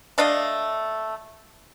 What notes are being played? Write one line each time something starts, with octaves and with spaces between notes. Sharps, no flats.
A3 D4 D#5 F5